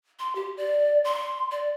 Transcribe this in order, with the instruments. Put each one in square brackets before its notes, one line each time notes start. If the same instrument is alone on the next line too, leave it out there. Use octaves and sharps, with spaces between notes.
[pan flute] C6
G4
D5
C6
D5